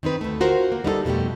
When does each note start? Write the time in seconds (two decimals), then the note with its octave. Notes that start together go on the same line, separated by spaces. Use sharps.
0.03 D#3 C4 D#4 B4
0.21 D2 A3
0.40 F4 F#4 A#4 C5
0.72 A#3
0.84 G3 D#4 E4 A4
1.05 F2 B2 G3 A3 G4